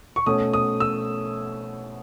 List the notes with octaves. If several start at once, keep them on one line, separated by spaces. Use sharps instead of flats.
C#6
B2 A3 C#4 D#6
D#6
E6